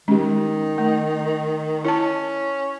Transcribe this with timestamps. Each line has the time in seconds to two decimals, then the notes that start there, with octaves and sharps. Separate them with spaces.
0.08 D#3 G#3 C#4 G4
0.78 A3
1.85 C#4 E4 A5